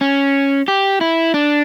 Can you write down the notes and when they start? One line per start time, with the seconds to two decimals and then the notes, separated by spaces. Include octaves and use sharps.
0.01 C#4
0.68 G4
1.01 E4
1.34 D4